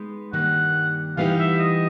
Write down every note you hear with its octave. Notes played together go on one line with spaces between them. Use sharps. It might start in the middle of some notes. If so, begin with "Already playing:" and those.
Already playing: G#3 B3 D#4
G2 D#3 G3 A#3 F#5
E3 G3 B3 D#4 G4 F5
E5
D#5